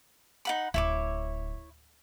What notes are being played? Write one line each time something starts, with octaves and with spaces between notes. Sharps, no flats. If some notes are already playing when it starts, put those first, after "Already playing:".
D#4 F#5 B5
D1 E4 C#5 D6